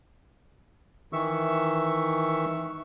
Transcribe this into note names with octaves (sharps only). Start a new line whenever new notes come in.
D#3 E3 E5 C#6 E6